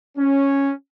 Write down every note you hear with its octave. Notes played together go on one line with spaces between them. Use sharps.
C#4